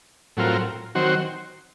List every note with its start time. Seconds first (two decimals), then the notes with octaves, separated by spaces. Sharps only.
0.37 A2 F#3 C4 F4 A#4
0.95 D#3 F#3 C4 F#4 C5